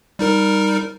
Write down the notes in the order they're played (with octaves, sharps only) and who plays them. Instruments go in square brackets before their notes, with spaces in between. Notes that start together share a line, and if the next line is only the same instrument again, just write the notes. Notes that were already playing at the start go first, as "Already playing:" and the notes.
[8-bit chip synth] G3 D#4 A#4